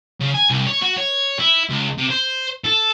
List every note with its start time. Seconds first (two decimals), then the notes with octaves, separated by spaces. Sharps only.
0.20 C#3
0.34 G#5
0.50 C2
0.66 C#5
0.82 F#4
0.97 C#5
1.39 E4
1.70 C#2
1.98 C3
2.10 C5
2.64 A4